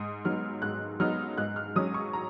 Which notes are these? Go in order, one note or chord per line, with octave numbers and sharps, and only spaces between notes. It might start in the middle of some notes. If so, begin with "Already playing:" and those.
Already playing: G#2 D#6
F#3 B3 D#4 F6
G#2 F#6
F#3 B3 D#4 F6
G#2 F#6
F6
F#3 C#4 D#6
C#6
A#5